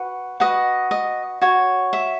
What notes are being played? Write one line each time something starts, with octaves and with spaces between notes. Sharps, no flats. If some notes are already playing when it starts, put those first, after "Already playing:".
Already playing: F#4 B4
F#4 B4 D#5
D#5
F#4 C#5
E5